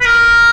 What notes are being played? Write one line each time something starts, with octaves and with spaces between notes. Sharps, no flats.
B4
A#4